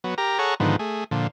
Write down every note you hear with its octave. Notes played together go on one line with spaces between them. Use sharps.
F#3 B3
G4 A#4 A#5
G#4 A4 C#5 F#5 A#5 C#6
G#2 D3 D#3 F3 B3
A3 G#4
A#2 D3 F3